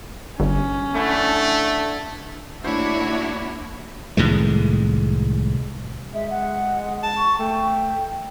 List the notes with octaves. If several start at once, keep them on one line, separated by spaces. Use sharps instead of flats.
G1 C#4
D3 A3 D4 E4
D#2 A3 A#3 D4 E4 F#4 C#5 E5
C2 A2 D#3 G#3
G#3 E5
F#5
A5
C#6
A3 G5